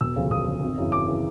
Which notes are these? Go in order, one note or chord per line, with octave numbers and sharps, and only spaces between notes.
E1 E6
D2 C#3 F3
E1 D#6
D2 C#3 F3
G#1
F#2 C#3 E3
G#1 D6
C#3 E3